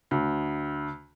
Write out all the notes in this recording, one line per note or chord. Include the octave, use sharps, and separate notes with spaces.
D2